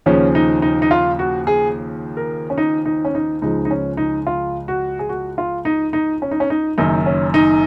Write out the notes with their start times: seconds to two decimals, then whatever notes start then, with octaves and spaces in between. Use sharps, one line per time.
0.06 D#2 C#3 F3 C#4
0.35 D#4
0.62 D#4
0.82 D#4
0.91 F4
1.19 F#4
1.47 G#4
2.17 A#4
2.50 C#4
2.58 D#4
2.86 D#4
3.05 C#4
3.15 D#4
3.42 C#2 C#3 F3 D#4
3.65 D#4
3.71 C#4
3.97 D#4
4.27 F4
4.68 F#4
4.99 G#4
5.09 F#4
5.38 F4
5.65 D#4
5.93 D#4
6.22 C#4
6.31 D#4
6.40 C#4
6.50 D#4
6.78 F#1 F#2 D#3 D#4
7.06 C#4
7.34 D#4